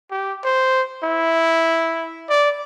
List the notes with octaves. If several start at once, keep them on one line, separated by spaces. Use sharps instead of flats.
G4
C5
E4
D5